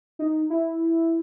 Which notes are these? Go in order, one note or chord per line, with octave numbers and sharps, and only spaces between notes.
D#4
E4